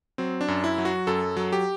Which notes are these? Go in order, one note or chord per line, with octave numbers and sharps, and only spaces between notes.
F#3 C4
D4
F#2
E4
F#3
F#4
F#2 A4
F#3
G4